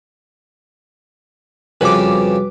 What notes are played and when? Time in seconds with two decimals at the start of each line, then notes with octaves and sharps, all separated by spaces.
1.81 F2 C#3 G3 F#4 B4 D6